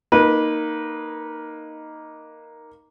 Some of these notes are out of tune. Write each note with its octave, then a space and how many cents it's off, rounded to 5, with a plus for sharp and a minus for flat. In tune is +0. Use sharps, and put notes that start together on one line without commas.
A#3 +0 D#4 +0 B4 -20